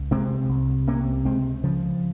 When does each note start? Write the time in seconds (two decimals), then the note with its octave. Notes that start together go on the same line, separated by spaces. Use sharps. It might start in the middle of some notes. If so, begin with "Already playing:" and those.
Already playing: C#2
0.11 C3 G#3 C4
0.49 C2
0.87 C3 A#3 C#4
1.25 C#2 G#3 C4
1.63 C#3 F3